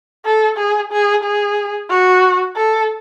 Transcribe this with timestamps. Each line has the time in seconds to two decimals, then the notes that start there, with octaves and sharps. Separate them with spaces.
0.26 A4
0.58 G#4
0.92 G#4
1.24 G#4
1.89 F#4
2.56 A4